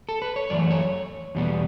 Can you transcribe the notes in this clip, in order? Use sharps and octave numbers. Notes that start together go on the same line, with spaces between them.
A4
B4
C#5
F#2 E3 A3 D5
C#5
E2 B2 G3 B3